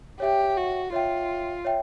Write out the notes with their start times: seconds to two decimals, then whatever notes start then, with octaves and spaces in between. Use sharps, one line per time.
0.20 G4 C#5 E5 G5
0.57 F#4
0.92 F4 C#5 E5 G5
1.65 C#5 E5 G5